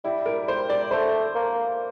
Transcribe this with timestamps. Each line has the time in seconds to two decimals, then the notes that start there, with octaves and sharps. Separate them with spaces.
0.04 G3 E4
0.26 A#4
0.48 C5
0.70 D5
0.91 A3 C5
1.35 A#3